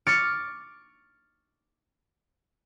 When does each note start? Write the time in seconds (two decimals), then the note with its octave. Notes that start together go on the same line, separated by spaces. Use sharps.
0.07 C#6 D6 F6 A6 C#7 D7